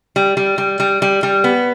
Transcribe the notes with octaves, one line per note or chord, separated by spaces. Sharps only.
G3
G3
G3
G3
G3
G3
B3